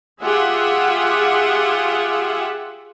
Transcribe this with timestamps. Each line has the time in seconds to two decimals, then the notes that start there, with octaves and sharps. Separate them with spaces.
0.23 F4 G4 G#4 E5 F#5